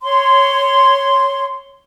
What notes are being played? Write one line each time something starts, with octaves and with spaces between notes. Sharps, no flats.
C#5 C6